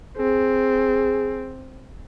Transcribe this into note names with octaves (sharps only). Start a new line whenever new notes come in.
C4 G#4